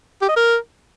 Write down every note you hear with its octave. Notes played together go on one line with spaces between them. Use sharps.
G4
D#5
A#4